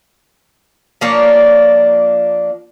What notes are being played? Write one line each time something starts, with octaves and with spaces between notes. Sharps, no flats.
F3 A#3 D4 C#5